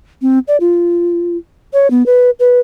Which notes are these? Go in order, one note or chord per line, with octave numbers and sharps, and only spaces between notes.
C4
D5
F4
C#5
B3
B4
B4